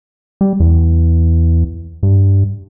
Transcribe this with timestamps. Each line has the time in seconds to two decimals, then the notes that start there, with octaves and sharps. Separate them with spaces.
0.41 G3
0.60 E2
2.03 G2